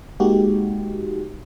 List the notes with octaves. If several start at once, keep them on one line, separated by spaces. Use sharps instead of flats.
G#3 A#3 D#4 F#4 G4